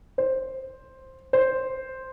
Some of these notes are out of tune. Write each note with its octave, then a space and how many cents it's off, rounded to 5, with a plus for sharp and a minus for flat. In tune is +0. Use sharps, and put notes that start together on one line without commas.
C5 +5
C5 +0